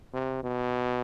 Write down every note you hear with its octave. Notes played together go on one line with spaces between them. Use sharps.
C3
B2